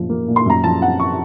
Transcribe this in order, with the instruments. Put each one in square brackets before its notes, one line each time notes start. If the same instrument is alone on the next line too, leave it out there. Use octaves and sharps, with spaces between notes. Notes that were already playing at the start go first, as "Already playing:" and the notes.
Already playing: [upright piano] F#2 A#2 F3
A#3
A#2
C6
F#2 A#5
F3 A5
C4 F#5
C#6